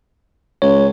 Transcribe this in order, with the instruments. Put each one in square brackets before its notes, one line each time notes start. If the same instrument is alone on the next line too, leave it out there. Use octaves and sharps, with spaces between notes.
[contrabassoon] C#2 [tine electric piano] C#5